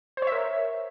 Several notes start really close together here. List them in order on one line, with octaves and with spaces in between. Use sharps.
C5 C#5 E5 A#4